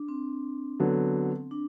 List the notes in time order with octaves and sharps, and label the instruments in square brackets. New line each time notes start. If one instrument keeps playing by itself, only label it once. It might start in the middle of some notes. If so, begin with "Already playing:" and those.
Already playing: [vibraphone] D4
C4
[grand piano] D3 F#3 B3
[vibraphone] D4